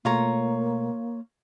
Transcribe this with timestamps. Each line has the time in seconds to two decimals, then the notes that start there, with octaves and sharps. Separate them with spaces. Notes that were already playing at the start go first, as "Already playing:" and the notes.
0.05 B2 A3 A#3 F4 C#5 A#5